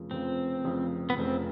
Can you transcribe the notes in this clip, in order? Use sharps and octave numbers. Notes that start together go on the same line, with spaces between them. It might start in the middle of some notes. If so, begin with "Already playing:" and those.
Already playing: F1 F2 C#3 F3
F1 F2 C#3 F3 C4
F1 F2 C#3 F3
B3
F1 F2 C#3 F3 C4